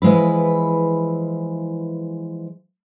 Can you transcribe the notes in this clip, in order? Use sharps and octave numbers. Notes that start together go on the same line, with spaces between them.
E3 F3 G#3 E4 B4